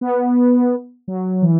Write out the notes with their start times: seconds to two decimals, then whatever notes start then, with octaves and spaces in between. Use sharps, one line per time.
0.01 B3
1.08 F#3
1.42 E3